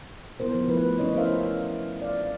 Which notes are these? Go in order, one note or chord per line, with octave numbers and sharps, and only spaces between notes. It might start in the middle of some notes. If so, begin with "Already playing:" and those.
B3 E4 A#4 C5
F3
A3 E4 B4
C#4 D#4 E4 C#5 D#5
D#4 E4 A#4 C5 E5 F5
D5 F5